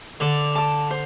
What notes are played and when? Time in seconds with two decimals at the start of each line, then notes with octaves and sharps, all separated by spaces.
0.20 D3 D5
0.55 A5 D6
0.91 C5